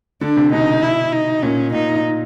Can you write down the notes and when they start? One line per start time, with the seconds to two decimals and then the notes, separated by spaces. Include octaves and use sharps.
0.21 D3 D4
0.37 C3
0.52 B2 D#4
0.82 E4
1.12 D#4
1.43 A#2 C#4
1.72 A#2 D#4